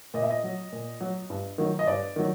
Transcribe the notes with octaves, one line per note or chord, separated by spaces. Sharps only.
A#2 D#5
E5
D#5
F#3
A#2
F#3
G2
D#3 F#3
D#5
G2 D5
D#3 F#3